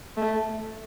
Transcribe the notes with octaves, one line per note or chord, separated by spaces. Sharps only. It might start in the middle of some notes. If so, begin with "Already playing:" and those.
A3